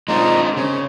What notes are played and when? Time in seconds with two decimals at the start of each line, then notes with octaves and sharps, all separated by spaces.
0.08 G#3 C4 D4 D#4 F4 D#5
0.56 C#3 C5